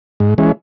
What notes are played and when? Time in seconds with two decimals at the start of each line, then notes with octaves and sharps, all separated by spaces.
0.20 G#2
0.38 E3 G#3 C#4